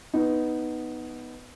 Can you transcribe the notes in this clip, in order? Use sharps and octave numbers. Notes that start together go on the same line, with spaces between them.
B3 D#4